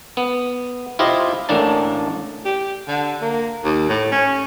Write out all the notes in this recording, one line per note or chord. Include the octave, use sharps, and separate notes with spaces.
B3
E4 F4 G4 C5 D#5
A1 A2 A#3 D4 A5
G4
D3
A#3
D#2
A2
C#4